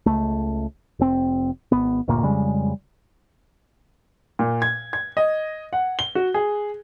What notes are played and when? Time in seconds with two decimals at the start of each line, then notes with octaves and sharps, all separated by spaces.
0.06 C#2 A3
0.99 F1 C4
1.72 G#1 B3
2.08 G1 D2 A#2 A#3
2.23 F2 C#3 G3 G#3
4.39 A#2
4.62 G#6
4.93 G#6
5.17 D#5
5.73 F#5
5.99 G7
6.15 F#4
6.34 G#4